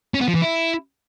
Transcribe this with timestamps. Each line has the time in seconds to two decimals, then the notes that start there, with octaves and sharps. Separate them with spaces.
0.14 C#4
0.21 B3
0.28 F3
0.35 E3
0.42 E4